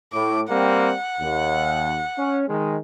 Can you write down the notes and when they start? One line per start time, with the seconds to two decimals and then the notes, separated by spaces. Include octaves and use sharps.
0.13 A2 D6
0.50 G3 A#3 C4 F#5
1.20 D#2
2.18 C#4
2.48 D#3 G#3